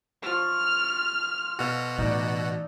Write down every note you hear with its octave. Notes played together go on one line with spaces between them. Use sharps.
F3 C#6 F6
B2 F#4 A4 F5
A2 E3 D#4 D5